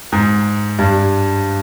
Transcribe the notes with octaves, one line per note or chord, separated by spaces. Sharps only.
G#2
G2